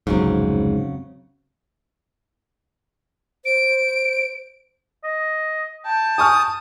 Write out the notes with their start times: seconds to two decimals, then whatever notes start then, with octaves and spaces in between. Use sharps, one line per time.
0.07 F1 C#2 G#2 C#3 F#3 C4
3.45 C5 D7
5.04 D#5
5.86 G5 A5
6.18 G#5 C#6 D#6 F6